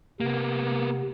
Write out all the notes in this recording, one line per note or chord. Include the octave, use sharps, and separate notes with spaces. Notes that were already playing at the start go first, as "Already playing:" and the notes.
C3 A#3 B3